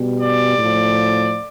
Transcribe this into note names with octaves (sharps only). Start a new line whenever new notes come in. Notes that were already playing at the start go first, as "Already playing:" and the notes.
Already playing: B2 G3
D5
A2 F3